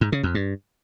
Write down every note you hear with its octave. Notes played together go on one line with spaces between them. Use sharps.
G#2
C#3
F2
G2